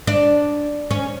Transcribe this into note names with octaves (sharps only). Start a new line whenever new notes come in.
D4
C#4